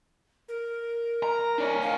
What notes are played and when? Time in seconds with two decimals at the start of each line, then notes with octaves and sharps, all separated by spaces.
0.49 A#4
1.23 A#5
1.58 D4 C#5
1.82 F5